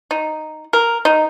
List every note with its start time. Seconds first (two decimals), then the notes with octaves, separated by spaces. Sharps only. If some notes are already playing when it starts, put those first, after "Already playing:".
0.11 D#4
0.73 A#4
1.05 D#4